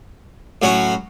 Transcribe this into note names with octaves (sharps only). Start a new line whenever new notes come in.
A2 F#3 C#4 F#4